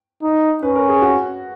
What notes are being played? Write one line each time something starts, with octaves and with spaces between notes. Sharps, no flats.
D#4
C#4 B4
A#4
G#4
F#4